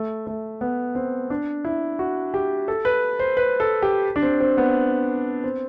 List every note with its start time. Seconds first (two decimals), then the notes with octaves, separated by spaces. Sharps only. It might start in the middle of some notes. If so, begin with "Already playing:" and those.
Already playing: A3
0.27 A3
0.61 B3
0.95 C4
1.30 D4
1.65 E4
1.99 F#4
2.34 G4
2.68 A4
2.85 B4
3.19 C5
3.37 B4
3.60 A4
3.82 G4
4.16 D4
4.22 C4
4.40 C4
4.58 B3
5.44 C4